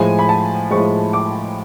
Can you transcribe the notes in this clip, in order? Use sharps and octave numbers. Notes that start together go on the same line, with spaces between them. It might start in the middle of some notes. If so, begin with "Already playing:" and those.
Already playing: A2 F3 G#3 G#5
B5
A5
A2 F3 G#3 C#6
D6